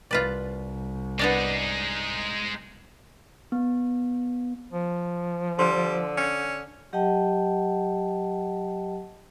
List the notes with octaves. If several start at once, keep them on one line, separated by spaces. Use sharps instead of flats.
C2 F4 B4 D5
G#3 B3 D4 D#4 D5
B3
F3
D3 G3 C5 C6
C#4
F#3 G4 D#5 F#5 G5 A5